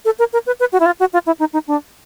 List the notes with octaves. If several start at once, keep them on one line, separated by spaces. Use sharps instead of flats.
A4
A#4
A#4
B4
B4
F#4
E4
F4
F#4
F4
E4
D#4
D#4
D4